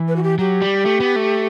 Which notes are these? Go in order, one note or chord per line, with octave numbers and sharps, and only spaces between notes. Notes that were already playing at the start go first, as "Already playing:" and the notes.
Already playing: E3
B4
F#4
G4
F#3 G4
G3
A3
B3
A3